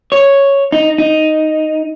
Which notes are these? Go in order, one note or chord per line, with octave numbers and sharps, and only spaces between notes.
C#5
D#4
D#4